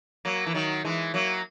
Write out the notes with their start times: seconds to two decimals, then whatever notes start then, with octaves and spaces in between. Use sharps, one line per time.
0.25 F#3 A#3
0.46 E3
0.54 D#3 F#3
0.85 E3 G#3
1.14 F#3 A#3